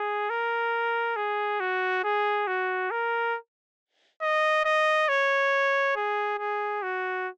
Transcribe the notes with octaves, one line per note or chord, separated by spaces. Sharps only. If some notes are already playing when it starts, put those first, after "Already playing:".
Already playing: G#4
A#4
G#4
F#4
G#4
F#4
A#4
D#5
D#5
C#5
G#4
G#4
F#4